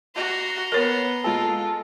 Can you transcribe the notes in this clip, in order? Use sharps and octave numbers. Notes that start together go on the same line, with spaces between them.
F#4 A#5 C6
B3 A#4 C#5
G#3 F4 A4